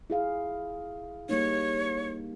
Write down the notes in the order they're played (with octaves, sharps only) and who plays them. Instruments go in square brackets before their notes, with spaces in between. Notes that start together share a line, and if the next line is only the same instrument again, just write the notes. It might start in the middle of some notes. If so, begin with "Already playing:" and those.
[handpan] E4 G#4 F5
[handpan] G3 A#3 D#4 [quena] C#5